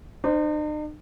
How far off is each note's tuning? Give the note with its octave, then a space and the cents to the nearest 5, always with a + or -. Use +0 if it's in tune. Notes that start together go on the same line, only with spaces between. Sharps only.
D#4 -45 C5 -10